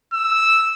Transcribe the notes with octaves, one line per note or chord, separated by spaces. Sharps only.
E6